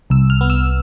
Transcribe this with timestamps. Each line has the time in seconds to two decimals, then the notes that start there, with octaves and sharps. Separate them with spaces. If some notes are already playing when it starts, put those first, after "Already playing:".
0.10 C2 E6
0.30 F6
0.41 B3
0.50 E6